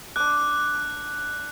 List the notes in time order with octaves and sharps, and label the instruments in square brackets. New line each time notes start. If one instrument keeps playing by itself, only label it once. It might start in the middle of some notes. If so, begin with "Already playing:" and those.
[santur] D4 D6 [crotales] F#6